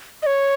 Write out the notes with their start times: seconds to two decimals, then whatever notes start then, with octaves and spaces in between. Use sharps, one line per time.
0.23 D#5
0.26 C#5